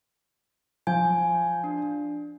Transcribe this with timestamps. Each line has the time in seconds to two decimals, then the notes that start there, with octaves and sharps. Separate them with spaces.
0.87 F3 G#5 G6
1.64 D4